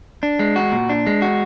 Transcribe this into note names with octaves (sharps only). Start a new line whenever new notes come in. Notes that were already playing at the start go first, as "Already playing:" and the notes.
D4
G#3
F#4
A#2
D4
G#3
F#4